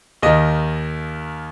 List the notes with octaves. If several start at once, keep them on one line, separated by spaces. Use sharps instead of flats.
D#2 D#3 D#5